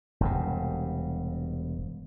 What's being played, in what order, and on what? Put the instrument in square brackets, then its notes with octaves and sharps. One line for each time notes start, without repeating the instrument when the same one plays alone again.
[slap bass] E1 G2 C3